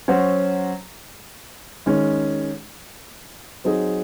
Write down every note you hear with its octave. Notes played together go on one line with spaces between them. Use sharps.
F#3 C#4 F#4 C5
D#3 G#3 C#4
F#3 C4 D#4 G#4